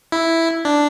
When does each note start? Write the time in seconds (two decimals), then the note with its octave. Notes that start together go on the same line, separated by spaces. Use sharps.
0.12 E4
0.65 D4